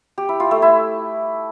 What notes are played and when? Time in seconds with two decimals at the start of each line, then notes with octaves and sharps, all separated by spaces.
0.18 G4
0.29 E4
0.40 F4
0.51 A3
0.62 E4